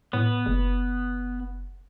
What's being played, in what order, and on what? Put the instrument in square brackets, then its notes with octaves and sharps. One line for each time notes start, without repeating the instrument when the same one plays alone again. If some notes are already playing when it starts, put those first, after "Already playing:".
[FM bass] A2 [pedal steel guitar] B3
[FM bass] F#1